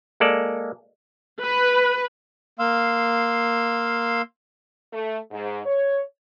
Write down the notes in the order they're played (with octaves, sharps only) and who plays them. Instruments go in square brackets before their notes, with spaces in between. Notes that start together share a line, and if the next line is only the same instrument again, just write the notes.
[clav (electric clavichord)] G#3 A#3 A4 D5
[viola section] B4
[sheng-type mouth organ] A#3 F5 C6 E6
[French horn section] A3
G#2
C#5